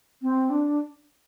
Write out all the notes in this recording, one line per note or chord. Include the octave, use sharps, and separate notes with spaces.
C4
D4